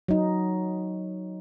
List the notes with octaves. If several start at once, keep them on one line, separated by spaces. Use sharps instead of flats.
F#3 D#4